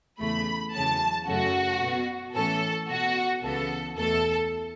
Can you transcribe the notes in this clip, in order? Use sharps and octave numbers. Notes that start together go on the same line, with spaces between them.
E2 C#3 A3 B5
E2 C#3 F#3 C#4 A5
F#2 C#3 A3 C#4 F#4
B2 B3
A2 E3 C#4 A4
B2 B3 F#4
C#2 C#3 E3 B3 A4
E2 B2 A3 A4